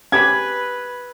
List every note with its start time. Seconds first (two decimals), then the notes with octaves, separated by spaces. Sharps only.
0.12 C#4 G4 B4 B5 G#6